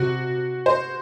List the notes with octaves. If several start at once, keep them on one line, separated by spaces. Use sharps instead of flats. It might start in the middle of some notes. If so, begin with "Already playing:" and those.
Already playing: C3 F#4
C5